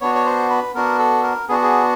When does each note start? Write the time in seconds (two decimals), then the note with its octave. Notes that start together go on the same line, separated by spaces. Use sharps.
0.01 B3 D4 F#4 C#5
0.15 C#5
0.25 C5
0.50 B4
0.74 B3 D4 F#4 A#4
0.99 A4
1.23 A#4
1.49 B3 D4 F#4 G#4
1.62 G#4